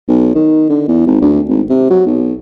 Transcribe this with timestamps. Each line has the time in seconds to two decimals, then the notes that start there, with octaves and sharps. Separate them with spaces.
0.08 B1
0.35 D#3
0.69 D3
0.88 E2
1.07 G#1
1.21 D2
1.49 G#1
1.70 C3
1.90 F#3
2.07 B1